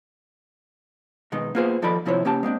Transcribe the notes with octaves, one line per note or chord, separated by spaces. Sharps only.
B2 D#3 G#3 D#4
A#3 B3 F4 G#4 C5
D#2 F3 D#4 A4 D5 B5
D#2 C3 F3 E4 C5 C#5
C#3 A#3 C#4 G4 G5 A5
G#3 A#3 C4 D4